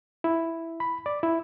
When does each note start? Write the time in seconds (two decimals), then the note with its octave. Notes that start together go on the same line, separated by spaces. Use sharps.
0.24 E4
0.80 B5
1.06 D5
1.23 E4